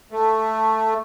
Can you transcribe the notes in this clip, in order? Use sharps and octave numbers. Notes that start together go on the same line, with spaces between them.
A3